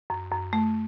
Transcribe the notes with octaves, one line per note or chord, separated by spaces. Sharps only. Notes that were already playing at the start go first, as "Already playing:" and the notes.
F#2
F#2
A3